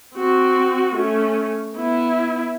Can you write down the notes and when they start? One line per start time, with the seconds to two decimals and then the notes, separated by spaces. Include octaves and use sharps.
0.16 C4 F#4
0.95 A3 C#4
1.76 B3 E4